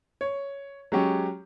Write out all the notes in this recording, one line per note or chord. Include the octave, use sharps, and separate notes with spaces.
C#5
F#3 G#3 C#4 G4